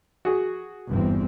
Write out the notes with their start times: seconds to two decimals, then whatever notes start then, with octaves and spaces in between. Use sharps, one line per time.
0.25 F#4 G#4
0.89 G1 E2 C4